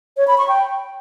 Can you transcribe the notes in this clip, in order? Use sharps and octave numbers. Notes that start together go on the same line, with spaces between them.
C#5
B5
C#6
G5